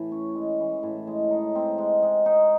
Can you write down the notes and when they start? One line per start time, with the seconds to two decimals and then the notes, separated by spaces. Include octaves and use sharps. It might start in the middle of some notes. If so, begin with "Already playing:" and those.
Already playing: A2 E3
0.12 C#4
0.35 G#3
0.60 E3
0.83 A2
1.07 G#3
1.31 D#4
1.55 C4
1.78 G#3
2.02 G#3
2.26 D#4